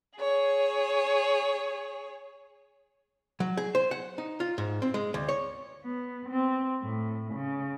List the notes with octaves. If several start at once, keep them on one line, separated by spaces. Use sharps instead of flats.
G#4 C#5
F#3
G#4
C5
F#5
D#4
F4
G#2
C4
G#3
D2
C#5
B3
C4
A2
C#3